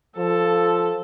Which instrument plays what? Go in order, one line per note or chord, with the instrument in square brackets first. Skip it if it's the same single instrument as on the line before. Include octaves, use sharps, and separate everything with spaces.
[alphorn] F3 [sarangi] A4